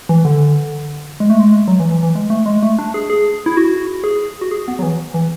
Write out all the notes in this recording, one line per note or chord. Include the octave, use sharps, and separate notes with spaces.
E3
D3
G#3
A3
G#3
F#3
E3
E3
E3
G#3
A3
G#3
A3
D4
G#4
G#4
E4
F#4
G#4
F#4
G#4
B3
F#3
E3
E3